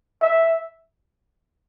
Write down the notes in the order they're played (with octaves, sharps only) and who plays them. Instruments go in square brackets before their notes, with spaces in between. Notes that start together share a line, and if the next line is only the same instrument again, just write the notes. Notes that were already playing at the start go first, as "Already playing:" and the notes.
[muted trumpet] E5